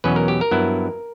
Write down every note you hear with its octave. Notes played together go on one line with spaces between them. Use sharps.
E2 B2 F#3 C#4 B4
A#4
G4
A#4
G2 F#3 B3 E4